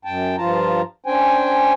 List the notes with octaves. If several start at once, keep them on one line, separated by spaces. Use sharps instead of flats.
F#2 G5 A5
G2 F3 F4 A5 A#5
C#4 D4 C5 G5 G#5